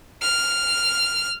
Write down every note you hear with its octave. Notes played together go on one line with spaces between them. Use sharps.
F6